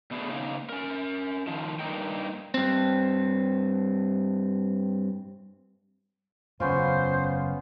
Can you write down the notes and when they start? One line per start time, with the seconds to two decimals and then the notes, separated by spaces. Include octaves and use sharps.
0.11 B2 A3 B3 D4 G#4
0.30 C#3 A#3 D#4
0.69 C#4 A#4
1.47 D#3 F3
1.79 G2 G#3 A#3 D#4 A#4 G5
2.54 G2 C4
6.60 F#1 E2 B3 C#4 F4 C5